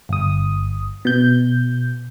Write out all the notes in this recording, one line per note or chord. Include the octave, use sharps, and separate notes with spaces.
G1 D#6
B2 G6